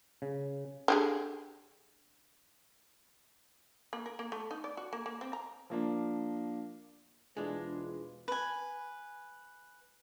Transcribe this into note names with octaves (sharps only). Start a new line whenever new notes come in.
C#3
D3 G4 G#4
A#3
A#4
A#3
A3
D#4
D5
F#4
A#3
A#3
C4
A#5
F3 A#3 D4
E1 G#2 G#3 D4 E4 F4 G#4 B4
B4 G#5